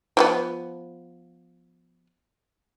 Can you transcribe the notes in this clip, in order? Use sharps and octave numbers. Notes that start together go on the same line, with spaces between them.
F3 A#3 B3